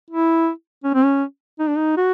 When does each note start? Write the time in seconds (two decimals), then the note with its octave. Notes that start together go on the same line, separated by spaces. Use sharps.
0.10 E4
0.84 C#4
0.94 C4
1.04 C#4
1.59 D#4
1.68 D4
1.77 D#4
1.97 F#4